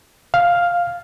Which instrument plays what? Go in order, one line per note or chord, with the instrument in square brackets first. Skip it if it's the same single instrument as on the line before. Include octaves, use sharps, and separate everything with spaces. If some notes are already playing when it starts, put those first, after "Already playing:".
[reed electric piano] F5